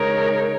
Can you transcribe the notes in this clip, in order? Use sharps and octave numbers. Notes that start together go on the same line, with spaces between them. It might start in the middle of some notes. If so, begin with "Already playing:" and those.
Already playing: C#3 G#3 D#4 A#4 C#5